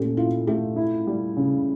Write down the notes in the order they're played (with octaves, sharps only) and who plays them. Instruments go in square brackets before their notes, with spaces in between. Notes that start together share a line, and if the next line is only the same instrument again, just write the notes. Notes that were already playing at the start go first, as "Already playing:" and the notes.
Already playing: [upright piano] A#2 A3 C#4 [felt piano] G4 A4
[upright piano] E4 [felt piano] F4
[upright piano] A3 [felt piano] G4
[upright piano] E4
G3
C#3